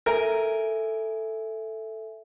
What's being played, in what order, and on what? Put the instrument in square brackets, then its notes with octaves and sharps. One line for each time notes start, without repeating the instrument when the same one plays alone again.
[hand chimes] A4 E5 G#5 [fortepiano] A#4